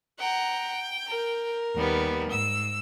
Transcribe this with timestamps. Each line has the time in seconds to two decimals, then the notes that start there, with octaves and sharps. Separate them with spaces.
0.19 F#5 G5 A#5
1.07 A#4
1.74 D#2 G3 B3
2.27 G#2 E6